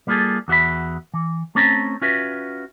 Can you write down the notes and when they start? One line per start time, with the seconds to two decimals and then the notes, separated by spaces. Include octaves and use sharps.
0.07 G3 A#3 F4 F#4 G#4 A4
0.48 E2 F#4 E5 B5
1.14 E3
1.55 A3 C4 C#4 A5 A#5
2.02 C#4 F4 F#4 B4 E5